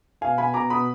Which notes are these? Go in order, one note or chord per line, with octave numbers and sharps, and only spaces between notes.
B2 F5 G#5
B2 G#5 B5
B2 A#5 D6
B2 B5 D#6